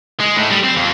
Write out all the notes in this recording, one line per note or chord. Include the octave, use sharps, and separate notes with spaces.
G#3
A2
G3
C4
F2